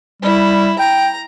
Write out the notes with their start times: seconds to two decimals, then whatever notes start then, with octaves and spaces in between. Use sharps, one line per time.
0.22 G3 E4
0.79 G5 A#5